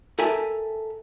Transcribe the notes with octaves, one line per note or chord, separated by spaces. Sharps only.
A4 A#4 E5 G5 G#5